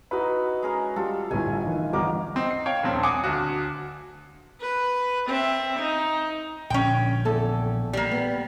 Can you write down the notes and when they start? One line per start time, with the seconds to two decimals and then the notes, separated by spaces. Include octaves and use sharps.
0.11 D#4 E4 F#4 B4
0.63 G#3 C#4 A#4
0.96 G3 F4 A4
1.31 G1 A2 G#5
1.65 D#3 E3
1.93 G1 A#4 D#5 D6
2.36 C4 D#5
2.51 C7
2.66 C#5 F5 G5
2.83 D#1 A#1 C4
3.03 F#5 G#5 D6 D#6
3.24 D2 F#4
4.61 B4
5.28 C4 E5
5.79 D#4
6.70 A#1 D3 C#4 G5
7.25 E2 A4
7.93 G3 A#3
8.11 B3